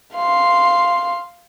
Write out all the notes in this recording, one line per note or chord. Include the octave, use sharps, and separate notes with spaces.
F5 C6